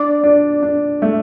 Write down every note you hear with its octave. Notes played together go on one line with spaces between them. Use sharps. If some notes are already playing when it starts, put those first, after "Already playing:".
Already playing: D4 D5
D4
D4
A3